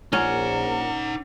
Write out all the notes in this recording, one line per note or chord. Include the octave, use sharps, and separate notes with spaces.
A#1 C#4 D#4 A#4 F#5